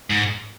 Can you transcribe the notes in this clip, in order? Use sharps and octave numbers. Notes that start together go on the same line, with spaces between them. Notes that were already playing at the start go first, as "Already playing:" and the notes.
G#2